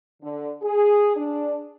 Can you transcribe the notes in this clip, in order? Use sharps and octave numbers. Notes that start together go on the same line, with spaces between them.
D3
G#4
D4